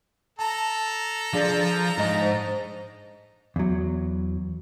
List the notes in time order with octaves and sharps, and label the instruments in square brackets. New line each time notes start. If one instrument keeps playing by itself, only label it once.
[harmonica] A4 A#5 [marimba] A5
[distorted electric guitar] F3 [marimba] D4 G#4 D5
[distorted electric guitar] G#2 D#5
[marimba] C5
[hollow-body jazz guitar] E2 F#3